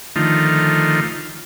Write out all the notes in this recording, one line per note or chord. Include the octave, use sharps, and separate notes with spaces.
D3 D#3 F3 A3 D#4 F4